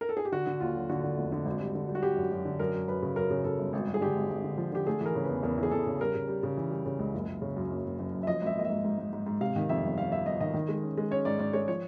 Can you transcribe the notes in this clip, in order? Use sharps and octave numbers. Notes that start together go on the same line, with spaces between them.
A#4
A4
G#4
G4
D3 F#4
D3
D#2 F4
F#3
D3 F#4
D3
F1
D3
G#1
G3
D3
G3
F#4
G3 G4
F#2
F#2
D3
F#2 A#4
F#2
F#2 B4
C#3
F#2 A#4
C#3
C#3 A4
G1
G#1
G2
G#4
D3 G4
G#1
G#1
D3
F3
D3 G4
A3 G#4
E3 A#4
C#3
B4
E2
E2 A#4
E3
G#4
E2 A4
C#3
G3 A#4
C#3
G3
C#3
E3
G3
C#3
C#2
F#1
F#1
C#3
F#2
F#1
F#1
F#1
F#2
E5
F3 D#5
G#1
E5
A#3 D#5
E5
G#2
G#2
G#2
G#2
G#2
C3 F5
D#3
F2 E5
G1
G1 F5
G1 E5
G1 D#5
D#3 D#5
D#3
G#3
C#4
G#3
C#4 C#5
G#2 D5
G#2 D5
G#3 C#5
F3 C#5